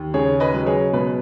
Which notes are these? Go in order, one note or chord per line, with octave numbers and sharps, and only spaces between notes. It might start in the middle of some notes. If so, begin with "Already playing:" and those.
Already playing: D#2
C#3 G#4 C#5
B4 D#5
F#3
G#4 C#5
B2 B4